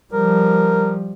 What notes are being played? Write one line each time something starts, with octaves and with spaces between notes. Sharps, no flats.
F3 G3 A#4